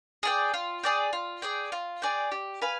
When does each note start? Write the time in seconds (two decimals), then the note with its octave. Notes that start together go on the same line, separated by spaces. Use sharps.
0.23 G#4 D5 G5
0.54 F4
0.83 G#4 D5 G5
1.13 F4
1.42 G#4 D5 G5
1.72 F4
2.02 G#4 D5 G5
2.32 G4
2.62 B4 F5 G#5